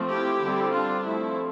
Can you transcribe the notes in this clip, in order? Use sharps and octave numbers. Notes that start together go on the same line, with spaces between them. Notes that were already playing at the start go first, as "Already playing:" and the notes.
Already playing: F3 A3 C4
E4 G4
D3 G3 C4
D4 F4
F3 A3 C4 E4